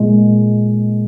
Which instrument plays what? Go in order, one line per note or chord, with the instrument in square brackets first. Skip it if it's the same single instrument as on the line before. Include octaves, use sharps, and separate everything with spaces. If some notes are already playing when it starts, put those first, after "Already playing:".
Already playing: [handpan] A#2 G#3